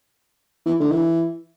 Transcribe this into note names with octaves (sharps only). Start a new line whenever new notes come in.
E3
D3
E3